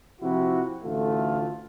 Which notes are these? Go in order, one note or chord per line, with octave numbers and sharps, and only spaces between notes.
C3 F3 E4 F#4
A1 D2 A3 F4